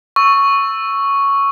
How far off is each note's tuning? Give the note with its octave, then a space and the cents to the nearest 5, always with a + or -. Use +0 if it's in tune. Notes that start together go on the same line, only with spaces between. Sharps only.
C#6 +0 E6 +0